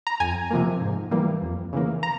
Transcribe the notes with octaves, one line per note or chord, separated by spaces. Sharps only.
A#5
F2 G#5
C3 F3 A#3
G#2
E3 G3 A#3
F2
C#3 E3 A#3
A#5